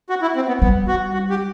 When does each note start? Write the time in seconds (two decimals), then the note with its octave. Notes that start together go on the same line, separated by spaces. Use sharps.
0.10 F#4
0.22 E4
0.36 C4
0.48 B3
0.61 G3 B3
0.88 F#4
1.13 F#4
1.30 G4